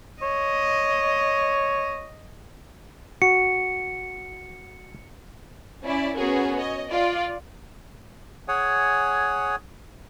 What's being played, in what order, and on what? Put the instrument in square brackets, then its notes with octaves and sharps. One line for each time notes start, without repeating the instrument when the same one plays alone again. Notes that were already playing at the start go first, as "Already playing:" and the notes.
[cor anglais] C#5 [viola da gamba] D#5
[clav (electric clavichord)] F#4 [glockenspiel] C#7
[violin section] C#4 E4 D5
B3 C#4 F#4 G#4 A#4
C#5 D#5
F4 D5
[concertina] G#4 C#5 F#5 G#5